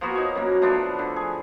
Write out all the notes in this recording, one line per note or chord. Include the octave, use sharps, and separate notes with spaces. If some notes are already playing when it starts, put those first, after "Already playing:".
F3 A#3 B3 F#4
D#4 C#5
F#2 A#3
F3 A3 B3 D4
D3
G#4